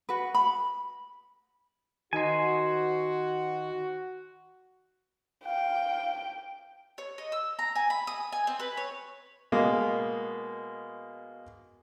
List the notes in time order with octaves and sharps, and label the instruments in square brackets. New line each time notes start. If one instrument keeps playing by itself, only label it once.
[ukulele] F#4 B4
B5
[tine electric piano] D#3 D#4 D#5 [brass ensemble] F#4 [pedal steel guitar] C5 G#5
[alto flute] F5 [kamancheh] G5
[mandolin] C#5
D#5
E6
A#5
G#5
B5
D#6
G#5
C4
B4
C#5
[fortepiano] B2 G#3 A#3